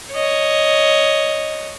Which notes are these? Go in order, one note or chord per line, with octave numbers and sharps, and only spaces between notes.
C#5 D#5